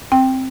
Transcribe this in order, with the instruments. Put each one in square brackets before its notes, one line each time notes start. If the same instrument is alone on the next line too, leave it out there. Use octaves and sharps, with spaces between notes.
[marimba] C4 G5